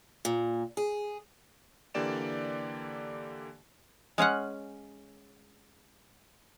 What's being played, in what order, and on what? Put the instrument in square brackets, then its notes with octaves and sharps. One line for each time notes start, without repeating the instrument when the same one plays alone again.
[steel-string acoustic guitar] A#2
G#4
[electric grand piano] D3 E3 A#3 G4 D5 E7
[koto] G#3 C#4 F5 F#5